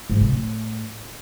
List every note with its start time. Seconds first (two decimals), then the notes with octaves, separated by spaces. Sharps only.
0.09 G#2
0.21 C3
0.32 A2